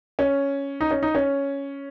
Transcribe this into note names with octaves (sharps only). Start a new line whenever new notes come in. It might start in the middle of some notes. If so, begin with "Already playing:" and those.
C#4
D#4
C#4
D#4
C#4